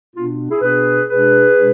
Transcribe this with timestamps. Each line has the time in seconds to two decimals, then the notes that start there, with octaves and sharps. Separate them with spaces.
0.15 B2 B3 D4 F4
0.50 E4 G#4
0.61 B2 B3 D4 G#4 B4
1.08 B2 G#3 D4 G#4 B4
1.54 B2 G#3 D4